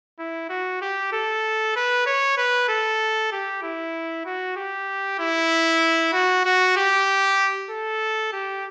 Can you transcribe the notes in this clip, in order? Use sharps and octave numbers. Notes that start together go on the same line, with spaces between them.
E4
F#4
G4
A4
B4
C#5
B4
A4
G4
E4
F#4
G4
E4
F#4
F#4
G4
A4
G4